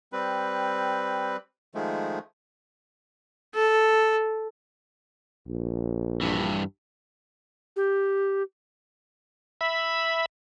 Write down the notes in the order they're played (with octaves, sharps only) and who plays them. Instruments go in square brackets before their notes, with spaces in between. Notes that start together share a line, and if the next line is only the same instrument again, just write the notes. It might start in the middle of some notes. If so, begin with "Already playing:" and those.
[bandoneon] G3 C4 B4
D#3 F3 G#3 A3
[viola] A4
[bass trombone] A#1
[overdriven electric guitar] G2 E3
[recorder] G4
[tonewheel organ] E5 B5